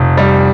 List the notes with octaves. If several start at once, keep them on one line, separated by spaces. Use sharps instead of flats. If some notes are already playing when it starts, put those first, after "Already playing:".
Already playing: F1
G3